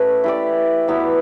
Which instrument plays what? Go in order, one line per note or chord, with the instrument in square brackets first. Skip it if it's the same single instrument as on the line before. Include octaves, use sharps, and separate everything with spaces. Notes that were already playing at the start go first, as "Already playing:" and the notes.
Already playing: [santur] A3 C#4 G4 A4 B4
E4 G4 D5
F#3 B3 E4 G4